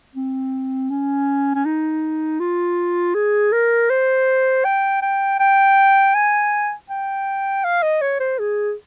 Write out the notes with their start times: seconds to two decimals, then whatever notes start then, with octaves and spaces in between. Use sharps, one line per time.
0.16 C4
0.90 C#4
1.55 C#4
1.65 D#4
2.40 F4
3.15 G#4
3.52 A#4
3.90 C5
4.65 G5
5.02 G5
5.40 G5
6.14 G#5
6.90 G5
7.64 F5
7.83 D#5
8.01 C#5
8.20 C5
8.39 G#4